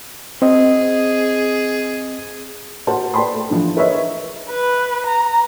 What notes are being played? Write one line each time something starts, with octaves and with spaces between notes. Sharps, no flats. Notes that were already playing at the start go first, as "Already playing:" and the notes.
C4 G#4 D#5
F#4 A#4 C5 F#5 A5
B4 D5 G5 A5 B5 C6
A3
D3 E3 F3 D4
G#4 A#4 B4 C#5 D#5 E5
B4
A#5